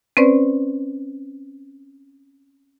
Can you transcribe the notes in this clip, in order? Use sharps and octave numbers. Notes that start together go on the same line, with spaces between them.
C4 C#4 B4 C5 D5